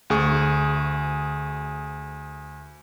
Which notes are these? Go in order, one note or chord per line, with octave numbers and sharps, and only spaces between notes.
D2 G#4 C#6